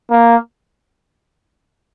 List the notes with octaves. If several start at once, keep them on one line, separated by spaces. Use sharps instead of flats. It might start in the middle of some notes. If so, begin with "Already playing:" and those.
A#3